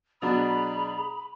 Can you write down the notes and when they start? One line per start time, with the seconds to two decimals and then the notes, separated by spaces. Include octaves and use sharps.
0.22 B2 F#3 D4 G#4 A#5 B5